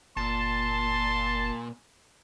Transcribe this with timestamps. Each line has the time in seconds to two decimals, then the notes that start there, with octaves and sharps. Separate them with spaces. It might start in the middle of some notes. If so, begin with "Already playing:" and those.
0.17 F#1 A#2 A5 C6